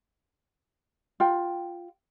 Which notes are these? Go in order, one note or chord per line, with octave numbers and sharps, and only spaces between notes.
F4 G5